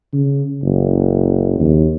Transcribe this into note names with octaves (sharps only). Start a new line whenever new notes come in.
C#3
F#1
D#2